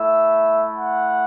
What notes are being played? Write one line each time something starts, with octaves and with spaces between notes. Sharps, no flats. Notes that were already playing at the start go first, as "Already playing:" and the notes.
Already playing: A3 E4 E5
F#5